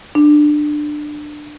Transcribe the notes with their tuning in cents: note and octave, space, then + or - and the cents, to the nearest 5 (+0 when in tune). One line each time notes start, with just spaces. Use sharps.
D4 +20